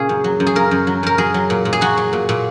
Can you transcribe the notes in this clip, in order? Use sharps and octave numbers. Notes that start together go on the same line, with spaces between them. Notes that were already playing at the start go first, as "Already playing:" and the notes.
Already playing: A#2 C#3 G#4
F#2
F#3
F#2
G#4
C#3 A#4
F#2
F#3
F#2 A#4
F#3 G#4
F#3
A#2
A#2
G#4
F#3 F#4
F#3
A#2
A#2